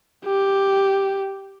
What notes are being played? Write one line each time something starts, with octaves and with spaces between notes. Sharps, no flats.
G4